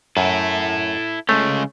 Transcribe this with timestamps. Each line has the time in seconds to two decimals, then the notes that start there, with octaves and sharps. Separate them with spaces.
0.17 F#2 E4 A4
1.29 C#3 G#3 A3 C#4